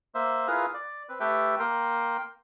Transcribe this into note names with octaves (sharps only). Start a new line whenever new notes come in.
A#3 C5 E5
E4 F4 G#4 A#4 B4 F5
D5
C4 B4
A3 G4 A4 B4 E5 G5
A#3 A#4 G5 C6